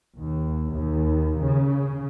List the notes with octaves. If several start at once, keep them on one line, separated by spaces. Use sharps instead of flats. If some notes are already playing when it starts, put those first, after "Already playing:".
D#2
D#2
C#3